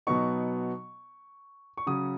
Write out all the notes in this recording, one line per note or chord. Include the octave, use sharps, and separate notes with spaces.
B2 F#3 B3 D#4 C#6
C#6
C#3 F#3 C#4 D#6